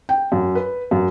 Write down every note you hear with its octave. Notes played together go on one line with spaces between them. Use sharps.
G5
F#2
B4
F#2